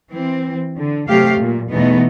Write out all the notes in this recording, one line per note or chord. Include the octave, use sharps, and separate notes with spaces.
E3 C4
D3
C3 F#3 A3 G4 F5
A#2
E2 B2 E3 A3 B3 D#4